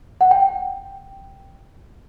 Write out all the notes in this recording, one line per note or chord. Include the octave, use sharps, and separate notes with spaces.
F#5
G5